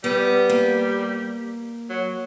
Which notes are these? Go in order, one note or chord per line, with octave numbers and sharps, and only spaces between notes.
G3 B3
A#3
F#3